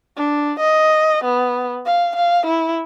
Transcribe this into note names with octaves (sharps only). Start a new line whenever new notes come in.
D4
D#5
B3
F5
F5
E4